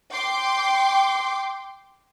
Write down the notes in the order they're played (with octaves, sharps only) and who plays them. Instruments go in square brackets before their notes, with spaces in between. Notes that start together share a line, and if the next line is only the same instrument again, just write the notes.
[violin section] G5 C6 D6